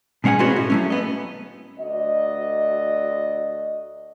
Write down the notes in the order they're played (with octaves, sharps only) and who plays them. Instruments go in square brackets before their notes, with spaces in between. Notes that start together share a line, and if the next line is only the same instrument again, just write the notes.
[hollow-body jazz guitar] B2 G#3 C#4 F#5 G#5
G#3 B3 C4 F4 F#4 C#5
A2
F#3 A3 C#4
B3 D#5
[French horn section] D2 F#4 D5 D#5